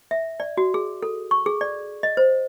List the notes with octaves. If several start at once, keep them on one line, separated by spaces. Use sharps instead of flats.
E5
D5
F#4
G#4
A4
C#6
G#4
D5
D#5
C5